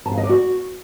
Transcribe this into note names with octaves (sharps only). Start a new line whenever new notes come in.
A5
F5
D#5
D5
F#4